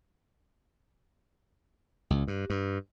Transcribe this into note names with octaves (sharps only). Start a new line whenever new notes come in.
C#2
G2
G2